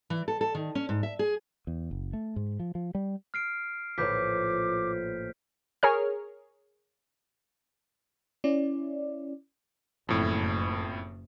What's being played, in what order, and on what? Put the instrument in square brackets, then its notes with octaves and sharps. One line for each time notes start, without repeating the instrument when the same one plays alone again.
[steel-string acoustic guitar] E3
A4
A4
D#3
C#4
G#2
E5
G#4
[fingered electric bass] E2
F#1
A3
G#2
F3
F3
G3
[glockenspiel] F6 C7 D7
[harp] A#1 A2 [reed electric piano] F4 B4 C#5 [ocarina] D6 [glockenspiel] G6 B6
[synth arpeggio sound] G#4 A#4 C#5 F6
[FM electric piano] C#4 E4 D5
[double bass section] F#1 [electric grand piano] F2 A2